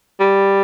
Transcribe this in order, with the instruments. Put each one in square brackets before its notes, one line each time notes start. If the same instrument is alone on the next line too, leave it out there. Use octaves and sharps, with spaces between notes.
[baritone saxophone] G3